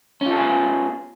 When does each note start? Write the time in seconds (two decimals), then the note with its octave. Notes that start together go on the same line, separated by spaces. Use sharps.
0.21 C#4
0.26 F4
0.31 A4
0.36 G#4
0.41 B3